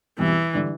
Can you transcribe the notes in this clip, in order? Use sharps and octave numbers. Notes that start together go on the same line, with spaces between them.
E2 B2 E3 G3 C4
D3 G3 D4